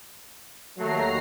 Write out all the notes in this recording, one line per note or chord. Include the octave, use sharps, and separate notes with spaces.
D#2 F#3 A3 A#5 C7